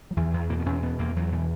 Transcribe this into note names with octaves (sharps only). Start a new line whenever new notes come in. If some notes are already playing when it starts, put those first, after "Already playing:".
F#3
E2 E3
E2
B2 A#3
B3
E2 C#4
B2 B3
E2 A#3
E2 F#3
B2 E3